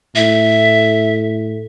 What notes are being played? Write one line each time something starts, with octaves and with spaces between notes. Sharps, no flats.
A2 E5